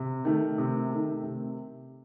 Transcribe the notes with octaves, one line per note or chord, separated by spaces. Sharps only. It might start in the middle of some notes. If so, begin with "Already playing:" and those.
Already playing: C3
D#3 A3
C3
D#3 A3
C3